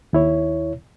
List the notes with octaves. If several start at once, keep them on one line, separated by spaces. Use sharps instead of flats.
D#2 E4 C#5